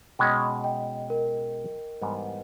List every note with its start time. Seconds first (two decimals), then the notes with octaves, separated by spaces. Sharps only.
0.19 B2 G#3 C#4 D#5 G5
0.64 D#5 G5
1.10 A#4
2.01 G#2 E3 G3 B3